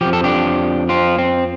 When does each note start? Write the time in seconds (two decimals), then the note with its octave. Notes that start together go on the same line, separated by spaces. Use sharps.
0.01 F2 F3 G4
0.13 A4
0.24 D4 G4
0.89 C4 F4
1.19 C4